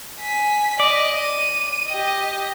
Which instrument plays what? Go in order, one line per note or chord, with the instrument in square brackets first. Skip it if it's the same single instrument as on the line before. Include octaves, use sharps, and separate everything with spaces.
[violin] G#5 B6
[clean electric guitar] D5 [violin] D#5
[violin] D#7
G4 D#5